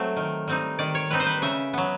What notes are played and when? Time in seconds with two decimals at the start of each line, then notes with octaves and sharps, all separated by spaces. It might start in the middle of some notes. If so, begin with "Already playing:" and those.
Already playing: F#3 A3 C4
0.17 D#3
0.48 G3 C4 D#4
0.79 D#3 D5
0.95 C#5
1.10 G3 C4 D#4 B4
1.20 C5
1.26 B4
1.42 C#3 E5
1.73 F#3 B3